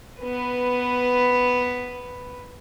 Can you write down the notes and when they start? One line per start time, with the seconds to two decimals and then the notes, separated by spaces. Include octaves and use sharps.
0.20 B3 B4